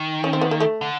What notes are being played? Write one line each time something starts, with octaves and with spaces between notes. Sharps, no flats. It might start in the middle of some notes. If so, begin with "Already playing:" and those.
Already playing: D#3
C#4
C4
B3
A#3
A3
D3